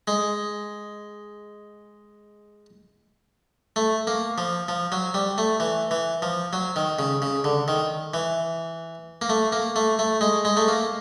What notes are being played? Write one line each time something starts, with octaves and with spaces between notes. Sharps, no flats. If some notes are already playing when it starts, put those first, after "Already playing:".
G#3
A3
A#3
F3
F3
F#3
G3
A3
E3
E3
F3
F#3
D#3
C#3
C#3
D3
D#3
E3
A#3
A3
A#3
A3
A3
G#3
G#3
A3
A#3